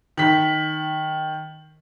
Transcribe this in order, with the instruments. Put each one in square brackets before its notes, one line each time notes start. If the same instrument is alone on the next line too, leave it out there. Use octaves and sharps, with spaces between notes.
[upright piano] D#3 B6